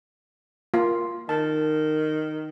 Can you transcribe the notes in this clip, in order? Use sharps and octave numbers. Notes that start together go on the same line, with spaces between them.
A#3 F4
D#3 A5